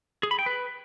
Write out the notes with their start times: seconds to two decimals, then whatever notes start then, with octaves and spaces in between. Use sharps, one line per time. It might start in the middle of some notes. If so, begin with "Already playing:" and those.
0.23 G#4
0.31 B5
0.39 G5
0.46 B4